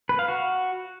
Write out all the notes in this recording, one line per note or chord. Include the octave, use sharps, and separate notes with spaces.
B4
F5
F#4